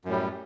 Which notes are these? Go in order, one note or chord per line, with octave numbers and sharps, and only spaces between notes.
F#2 A2 G3